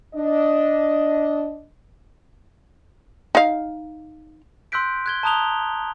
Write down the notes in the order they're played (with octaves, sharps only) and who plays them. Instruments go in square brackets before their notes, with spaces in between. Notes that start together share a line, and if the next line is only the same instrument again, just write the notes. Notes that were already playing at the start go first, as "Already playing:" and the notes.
[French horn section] D4 D#5
[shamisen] D#4 F5
[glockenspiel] C6 E6 F#6 G6 B6 D7
F#6 G#6 G7
A5 A#5 D#6 F#6 F7 G7